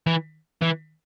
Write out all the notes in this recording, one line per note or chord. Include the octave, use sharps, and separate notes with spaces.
E3
E3